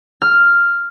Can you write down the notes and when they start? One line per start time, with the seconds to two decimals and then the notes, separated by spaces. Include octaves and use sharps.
0.22 F6